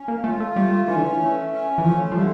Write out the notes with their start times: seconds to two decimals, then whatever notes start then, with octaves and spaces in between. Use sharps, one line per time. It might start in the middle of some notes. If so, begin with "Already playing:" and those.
Already playing: C#4
0.08 A#3
0.24 A3 F4
0.40 A3
0.56 G3 A3
0.88 E3 C#4
0.96 D3
1.04 E3
1.20 A3
1.52 C#4
1.78 E3
1.84 F3 A3
2.12 F3
2.17 D3 G3